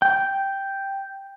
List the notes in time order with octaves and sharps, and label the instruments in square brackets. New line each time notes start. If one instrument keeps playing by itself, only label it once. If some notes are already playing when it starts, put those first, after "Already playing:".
[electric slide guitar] G5